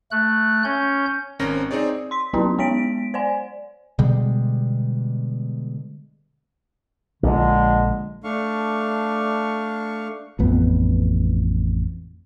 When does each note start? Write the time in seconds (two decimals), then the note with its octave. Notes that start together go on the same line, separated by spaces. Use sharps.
0.11 A3 F#6
0.64 C#4 G6
1.39 G#1 C4 C#4 A#4 A#6
1.71 C4 D#4 G#4 C#5 D5
2.11 C6 B6
2.33 F#3 B3 C#4 D4 E4 G4
2.58 G#3 B3 C#5 B6 D7
3.14 C5 D5 G#5
3.99 B2 D3 G3 G#3
7.23 A#1 A#2 D3 G#3
8.24 A3 D4 F5 C#6
10.39 A1 F2 B3